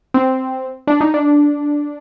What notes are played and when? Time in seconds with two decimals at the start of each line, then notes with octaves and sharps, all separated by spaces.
0.14 C4
0.87 D4
1.01 D#4
1.14 D4